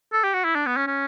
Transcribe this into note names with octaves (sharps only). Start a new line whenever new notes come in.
A4
G4
F#4
E4
D4
B3
C#4
C#4